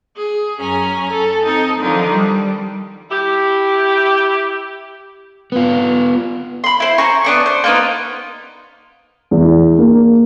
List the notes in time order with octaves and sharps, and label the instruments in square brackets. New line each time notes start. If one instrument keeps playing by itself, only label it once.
[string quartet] G#4
F#2 C#4 G#5 A#5
A4
C4 D#4 A4 D#5
D3 D#3 F3 D#4
G3
[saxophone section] E4 G4
[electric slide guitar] B3 F4
[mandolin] B5 C6
E4 C5
C5 G#5 A#5 C#6
B3 D4 C#6
C5
A#3 B3 D#4
[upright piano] E2
A#3